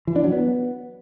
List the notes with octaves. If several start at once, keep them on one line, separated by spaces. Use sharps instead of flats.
E3
D4
F#3
B3